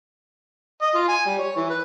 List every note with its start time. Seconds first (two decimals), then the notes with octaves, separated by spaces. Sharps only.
0.81 D#5
0.95 F4
1.08 G#5
1.25 G3
1.39 C#5
1.56 E3
1.70 B4